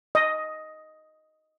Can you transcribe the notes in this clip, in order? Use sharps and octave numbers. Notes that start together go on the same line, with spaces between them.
D#5